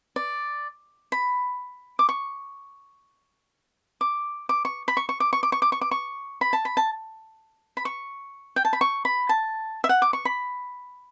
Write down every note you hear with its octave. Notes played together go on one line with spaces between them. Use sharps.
D5
B5
D6
C#6
D6
D6
C#6
B5
C#6
C#6
D6
C#6
D6
C#6
D6
C#6
D6
C#6
B5
A5
B5
A5
B5
C#6
G5
A5
B5
C#6
B5
A5
E5
F#5
D6
C#6
B5